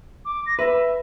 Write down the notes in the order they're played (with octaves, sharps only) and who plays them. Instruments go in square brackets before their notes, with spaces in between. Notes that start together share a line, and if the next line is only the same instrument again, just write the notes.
[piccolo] D6
A#6
[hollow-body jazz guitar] B4 [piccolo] E5